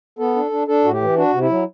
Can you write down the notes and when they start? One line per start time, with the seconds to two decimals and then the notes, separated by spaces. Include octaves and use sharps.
0.19 B3 A4
0.36 D4
0.51 D4
0.68 D4 A4
0.84 A2 F#4
0.93 G4
1.01 E3
1.17 D4 F#4
1.33 C3
1.42 E4
1.49 F#3